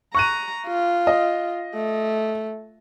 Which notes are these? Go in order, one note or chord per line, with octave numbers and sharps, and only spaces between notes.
A#5 C#6 F#6 D#7
F4
D#5
A3